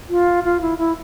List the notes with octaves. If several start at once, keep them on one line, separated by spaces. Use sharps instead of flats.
F4
F4
E4
E4